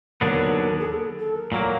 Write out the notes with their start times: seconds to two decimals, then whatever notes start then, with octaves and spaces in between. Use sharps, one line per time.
0.21 D#2 D3 F#3 B3 D4 A#4
0.79 G#4
0.86 A4
1.19 A4
1.35 A#4
1.52 A#2 F#3 A#3 A#4